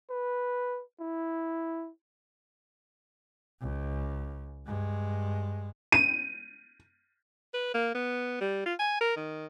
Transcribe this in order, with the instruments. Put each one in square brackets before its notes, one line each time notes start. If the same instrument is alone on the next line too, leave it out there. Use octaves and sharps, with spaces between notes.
[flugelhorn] B4
E4
[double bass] C#2
G2 G#3
[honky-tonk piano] D#7
[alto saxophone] B4
A#3
B3
G3
F4
G#5
A#4
D#3